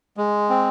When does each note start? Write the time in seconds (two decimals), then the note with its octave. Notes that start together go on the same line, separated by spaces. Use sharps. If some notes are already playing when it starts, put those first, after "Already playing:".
0.17 G#3
0.50 C4